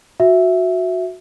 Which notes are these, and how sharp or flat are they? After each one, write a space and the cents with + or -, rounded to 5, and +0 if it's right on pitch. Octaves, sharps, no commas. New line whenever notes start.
F#4 -15 E5 +0